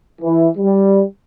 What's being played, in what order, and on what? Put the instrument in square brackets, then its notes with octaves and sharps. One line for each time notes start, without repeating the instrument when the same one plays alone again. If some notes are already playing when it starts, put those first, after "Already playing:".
[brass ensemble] E3
G3